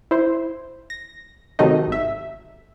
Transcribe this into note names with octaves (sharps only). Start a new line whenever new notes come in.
E4 C5
A#6
C3 D#3 F#3 A3 D#4 D#5
G#1 E5